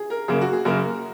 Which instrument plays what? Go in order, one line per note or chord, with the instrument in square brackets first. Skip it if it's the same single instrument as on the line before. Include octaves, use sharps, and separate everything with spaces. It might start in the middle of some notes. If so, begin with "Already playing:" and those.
Already playing: [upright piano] G#4
A#4
[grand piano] F#2 C#3 A#3 [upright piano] G#4
[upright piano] F#4
G#4
[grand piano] F#2 C#3 A#3 [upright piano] A#4